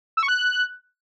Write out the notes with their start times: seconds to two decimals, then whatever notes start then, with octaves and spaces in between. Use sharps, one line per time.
0.17 E6
0.23 C#6
0.28 F#6